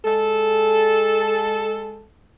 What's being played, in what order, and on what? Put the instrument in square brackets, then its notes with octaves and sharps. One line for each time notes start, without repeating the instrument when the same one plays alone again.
[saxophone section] G#3 A4